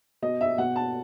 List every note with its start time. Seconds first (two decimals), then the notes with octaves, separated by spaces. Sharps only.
0.22 B2 D#5
0.41 E5
0.58 B2 F#5
0.76 A5